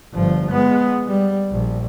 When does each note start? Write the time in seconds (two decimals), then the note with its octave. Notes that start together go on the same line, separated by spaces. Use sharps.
0.14 G1 F3
0.52 G#3 B3
1.07 G3
1.51 A#1